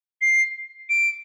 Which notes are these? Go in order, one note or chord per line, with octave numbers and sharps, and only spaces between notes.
C7
D7